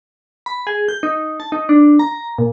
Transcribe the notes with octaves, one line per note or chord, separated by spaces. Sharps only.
B5
G#4
G6
D#4
A5
D#4
D4
A#5
A#2